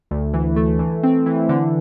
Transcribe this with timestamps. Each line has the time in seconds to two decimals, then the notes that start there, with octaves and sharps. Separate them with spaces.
0.11 D2
0.34 E3
0.56 A3
0.79 E3
1.03 C4
1.26 E3
1.49 D3